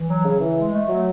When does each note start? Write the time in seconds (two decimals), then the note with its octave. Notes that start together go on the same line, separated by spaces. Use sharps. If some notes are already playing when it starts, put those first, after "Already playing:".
Already playing: E3
0.09 F#3
0.25 C#3
0.40 E3
0.56 G#3
0.72 A3
0.88 F#3